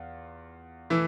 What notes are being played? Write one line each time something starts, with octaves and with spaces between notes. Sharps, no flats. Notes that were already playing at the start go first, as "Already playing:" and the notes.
Already playing: E2 F4
E3 A3 E4